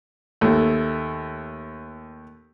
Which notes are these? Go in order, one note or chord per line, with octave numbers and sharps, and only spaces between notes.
D#2 A3